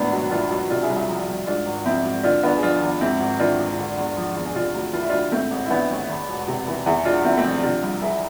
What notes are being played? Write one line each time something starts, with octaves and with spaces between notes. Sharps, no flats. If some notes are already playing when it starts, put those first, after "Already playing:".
Already playing: G#1 A2 B3 D4
B1
E3 D4 F4
B1
C3 D4 F4
E4 G#4
C2
E4 G#4
F3
C2
G#2 D4 F4
G#1
F3 C4 E4
G#1
D3 D4 F4
E2 B3 D4
G#4
F3 D4 F4
E2
G#2 C4 E4
G#1
E3 D4 F4
G#1
D3
E2
F3
E2
G#4
C3 D4 F4
D2
E3 F4
E4
D2 D4 F4
G#2 A3 C4
A1
E4
E3 B3 D4
A1
E2
E1
C3
E3
E2 E4 G#4
E1 D4 F4
D3 C4 E4
A3 C4
F3
C3 D4 F4
C2
E3 E4 G#4